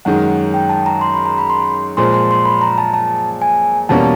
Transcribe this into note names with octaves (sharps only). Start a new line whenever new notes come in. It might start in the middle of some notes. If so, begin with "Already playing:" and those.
F#2 D#3 G#3 F#5
G5
A5
A#5
C6
B5
A#5
B5
C6
A#2 F3 G#3 C6
C6
C6
B5
A#5
A5
A5
G#5
E2 B2 G3 A#3 C#4 A5